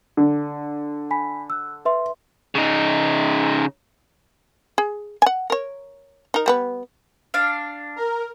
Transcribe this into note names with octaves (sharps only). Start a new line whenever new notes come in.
D3
G#5 B5 B6
E6 F#6
B4 E5 C6
C#3 D#4
G#4
F#5 G#5
A#4 C#5
D#4 A#4
G3 B3 B4
D4 F5
A#4